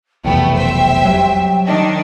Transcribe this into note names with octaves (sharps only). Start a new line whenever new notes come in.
F1 B1 E2 A3 B3 G5
C5 E5
F#3 G3
D#3 D4 D#5